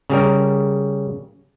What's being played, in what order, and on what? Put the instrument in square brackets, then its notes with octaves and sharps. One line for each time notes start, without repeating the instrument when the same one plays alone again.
[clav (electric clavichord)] C#3 G3 A#4